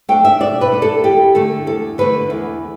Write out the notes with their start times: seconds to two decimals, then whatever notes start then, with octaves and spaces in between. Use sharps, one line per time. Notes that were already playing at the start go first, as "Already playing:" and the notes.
0.09 A3 D4 G5
0.25 E5
0.40 B2 D5
0.61 B4
0.72 A3 D4
0.82 A4
1.04 E2 G4
1.35 D3 A3 A4
1.67 E2 A4
1.98 D3 A3 B4
2.30 E2